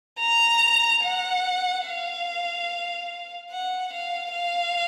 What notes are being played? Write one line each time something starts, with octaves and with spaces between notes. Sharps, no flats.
A#5
F#5
F5
F#5
F5
F5